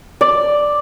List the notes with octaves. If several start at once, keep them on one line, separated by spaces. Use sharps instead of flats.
D5